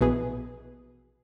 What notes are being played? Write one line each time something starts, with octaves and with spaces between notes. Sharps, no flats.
A#1 B2 E3 G#4 B4